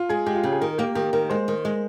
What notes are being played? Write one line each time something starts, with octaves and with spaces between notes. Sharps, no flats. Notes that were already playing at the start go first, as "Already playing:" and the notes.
Already playing: F4
G#3 G#4
G#3 G4
F4
C#3 G4
G#4
D#3 A#4
A#3 G4
D#3 G4
D#3 A#4
G#3 C5
D#3
G#3